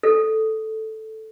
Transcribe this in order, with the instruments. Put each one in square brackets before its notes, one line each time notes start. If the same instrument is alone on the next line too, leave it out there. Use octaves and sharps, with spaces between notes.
[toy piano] A4